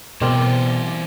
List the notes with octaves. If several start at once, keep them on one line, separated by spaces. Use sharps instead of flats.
B2 E3 C4 A#4 C5 D5